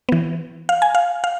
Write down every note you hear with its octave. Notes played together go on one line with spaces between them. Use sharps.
E3 B3
F5
G#5
F5
F5